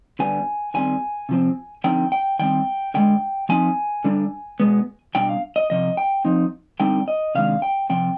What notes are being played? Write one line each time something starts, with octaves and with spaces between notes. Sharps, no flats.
D3 G3 B3 D4 G#5
D#3 G3 C4 G#5
C3 F3 C4
D3 F3 C4 D#4 G5
G5
D#3 G3 C4 G5
D3 F3 G#3 G5
F3 C4 D#4 G#5
D3 G3 D4
B2 G#3 B3
B2 G3 D4 G5
F5
D#5
C3 F3 D#5
G5
F3 C4 D#4
D3 G3 C4 D#4 G5
D#5
C3 D#3 G#3 D4 F5
G5
C3 F3 C4 G5